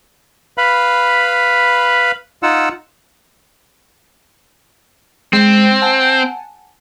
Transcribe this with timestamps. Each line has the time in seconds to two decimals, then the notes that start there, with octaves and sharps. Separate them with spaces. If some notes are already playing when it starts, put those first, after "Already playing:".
0.58 B4 F5 B5
2.43 D#4 F4 F#5 E6
5.33 G#3 C4
5.82 F#5 G#5 A5